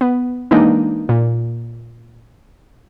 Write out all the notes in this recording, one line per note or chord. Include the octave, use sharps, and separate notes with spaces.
B3
E3 G#3 A#3 D4 D#4
A#2